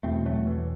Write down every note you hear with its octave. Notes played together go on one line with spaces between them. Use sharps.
E2 B2 A3 C4
F#3 A3
E3